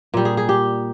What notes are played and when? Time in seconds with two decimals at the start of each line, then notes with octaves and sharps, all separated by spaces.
0.14 A#2 G3
0.25 G#4
0.37 G#4
0.49 G4